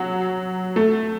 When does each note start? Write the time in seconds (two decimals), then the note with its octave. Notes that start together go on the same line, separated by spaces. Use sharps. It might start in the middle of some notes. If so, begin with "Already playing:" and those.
Already playing: F#3
0.76 A3